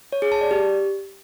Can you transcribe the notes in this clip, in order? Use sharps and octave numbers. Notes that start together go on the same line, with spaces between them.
C#5
G#4
A5
D5
G4